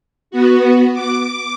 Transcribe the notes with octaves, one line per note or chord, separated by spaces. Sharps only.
B3 F#4
D6